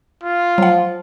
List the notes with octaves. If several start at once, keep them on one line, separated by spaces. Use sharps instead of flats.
F4
F3 F#3 F#5